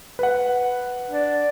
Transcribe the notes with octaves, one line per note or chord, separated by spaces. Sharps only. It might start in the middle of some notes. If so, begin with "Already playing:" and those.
B4 F#5
D4